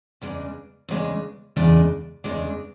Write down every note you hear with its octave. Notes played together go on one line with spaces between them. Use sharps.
E2 C#3 G#3 D4
E2 C#3 G#3 D4
E2 C#3 G#3 D4
E2 C#3 G#3 D4